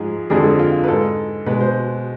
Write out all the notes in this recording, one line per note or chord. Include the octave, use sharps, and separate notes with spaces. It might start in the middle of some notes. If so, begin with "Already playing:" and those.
Already playing: G#2 F3 G#3 G#4
F2 D3 F3 G#3 G#4
A4
G#4
F4
B4
G#2 G#3 A4
B2 G#3 B4
C5